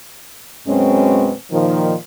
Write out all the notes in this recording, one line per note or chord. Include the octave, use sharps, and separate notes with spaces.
F#2 B2 G#3 C4 C#4
A#2 D#3 F3